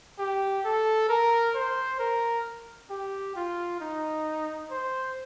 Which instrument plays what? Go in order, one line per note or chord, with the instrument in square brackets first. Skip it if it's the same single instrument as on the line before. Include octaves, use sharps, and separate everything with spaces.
[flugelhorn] G4
A4
A#4
C5
A#4
G4
F4
D#4
C5